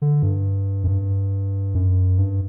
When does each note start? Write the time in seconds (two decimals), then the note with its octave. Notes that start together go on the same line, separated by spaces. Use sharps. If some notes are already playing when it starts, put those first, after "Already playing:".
0.02 D3
0.22 G2
0.84 F#2
0.87 G2
1.75 F#2
2.18 G2